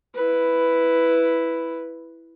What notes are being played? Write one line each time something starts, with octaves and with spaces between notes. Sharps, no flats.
E4 B4